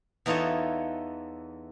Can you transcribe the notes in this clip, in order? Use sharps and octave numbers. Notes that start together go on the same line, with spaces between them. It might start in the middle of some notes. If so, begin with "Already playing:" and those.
E2 E3 D#4 F4 A4 C#5